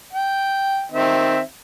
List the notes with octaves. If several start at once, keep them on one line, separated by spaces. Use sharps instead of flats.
G5
D#3 C4 E5